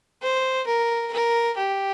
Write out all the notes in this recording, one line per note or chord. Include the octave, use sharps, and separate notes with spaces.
C5
A#4
A#4
G4